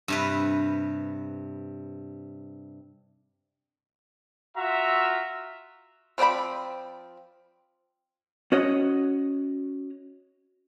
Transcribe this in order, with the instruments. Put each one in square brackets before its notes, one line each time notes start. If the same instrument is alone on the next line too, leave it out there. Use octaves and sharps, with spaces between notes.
[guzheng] G2 C3 B4
[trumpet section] F4 F#4 E5 A#5
[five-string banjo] F3 C4 D5 G5 B5
[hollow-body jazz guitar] C#4 F#4 C#5 D#5